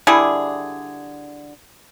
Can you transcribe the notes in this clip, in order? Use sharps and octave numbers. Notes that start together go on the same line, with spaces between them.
D3 G3 E4 G#4